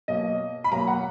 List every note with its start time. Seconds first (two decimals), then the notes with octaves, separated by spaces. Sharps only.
0.08 B2 F#3 A#3 D#5
0.64 B5
0.71 B2 F#3 A#3 A#5
0.88 F#5